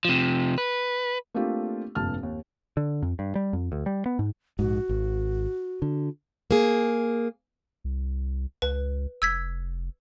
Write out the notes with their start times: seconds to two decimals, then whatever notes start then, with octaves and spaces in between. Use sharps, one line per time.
0.05 C3 F3
0.58 B4
1.34 A3 A#3 C4 D4 F4 G4
1.95 F1 A#1 G2 A5 F6
2.23 D#2
2.77 D3
3.02 F2
3.19 G2
3.35 G3
3.53 F2
3.72 D2
3.86 G3
4.06 B3
4.19 G#2
4.59 A#1 G#2 F#4
4.89 G#1
5.82 D3
6.51 A#3 G#4
7.84 C2
8.62 C#2 B4
9.22 F1 E6 G#6 B6